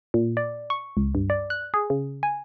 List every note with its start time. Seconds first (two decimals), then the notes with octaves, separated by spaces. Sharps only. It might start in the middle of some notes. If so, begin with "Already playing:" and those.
0.14 A#2
0.37 D5
0.70 C#6
0.97 C#2
1.15 G2
1.30 D5
1.50 F#6
1.74 G#4
1.90 C#3
2.23 G#5